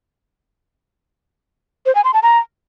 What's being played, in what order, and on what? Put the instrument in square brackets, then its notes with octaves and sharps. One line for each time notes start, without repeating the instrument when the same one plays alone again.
[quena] C5
G#5
C6
A5
A#5